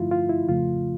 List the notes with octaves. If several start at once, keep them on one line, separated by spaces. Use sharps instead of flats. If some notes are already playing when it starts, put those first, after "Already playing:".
Already playing: G2 D3 F3 A3 E4 F4
F4
E4
F2 C#3 F3 A3 F4